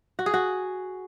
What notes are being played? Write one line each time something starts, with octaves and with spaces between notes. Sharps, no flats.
F#4
G#4
F#4